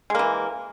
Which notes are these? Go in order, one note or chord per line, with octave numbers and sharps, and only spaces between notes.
E3 G#3 A#3